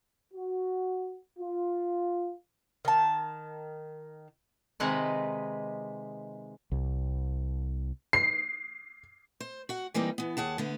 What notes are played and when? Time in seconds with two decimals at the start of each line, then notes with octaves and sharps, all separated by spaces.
0.34 F#4
1.39 F4
2.85 D#3 A5
4.80 C3 D#3 G#3 D#4 B4 D#5
6.72 C2
8.13 C7
9.40 C5
9.69 F#4 F#5
9.94 E3 G3 A#3 C4 D#4
10.18 E3 B3
10.37 D#2 G#4 F#5 A5
10.58 D3 A3 B3